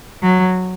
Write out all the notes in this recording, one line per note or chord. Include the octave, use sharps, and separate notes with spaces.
F#3